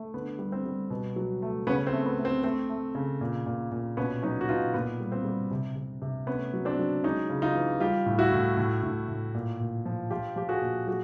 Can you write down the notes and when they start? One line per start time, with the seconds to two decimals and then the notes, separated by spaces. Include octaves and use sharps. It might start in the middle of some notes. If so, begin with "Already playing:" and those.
Already playing: A3
0.14 D3 B3
0.39 G3
0.52 C4
0.66 G3
0.90 B2
1.16 F#3
1.42 A3
1.67 C#3 B3 C#4
1.87 C4
1.93 A3
2.06 B3
2.19 A3
2.25 C4
2.44 A3 C4
2.69 A3
2.95 C#3
3.21 A#2
3.46 A#2
3.71 A#2
3.97 B2 B3 C#4
4.23 F#3 C#4 D#4
4.41 F#4
4.49 B2 D#4 F4
4.74 A#2 B3
5.00 G3
5.12 C4
5.25 G3
5.51 C3
5.76 C3
6.02 C3
6.27 A3 B3 C#4
6.54 F#3
6.65 C4 D4
6.79 F#3
7.04 G#3 C#4 D#4
7.30 C#3
7.42 D#4 F4
7.55 E3
7.80 G3 F4 G4
8.06 A2
8.19 E4 F#4
8.32 A2
8.57 A2
8.83 A2
9.08 A2
9.34 A#2
9.60 A#2
9.86 F3
10.10 F3 F4 G4
10.36 F3 G4
10.49 F#4 G#4
10.61 A#2
10.87 F#3 F#4 G#4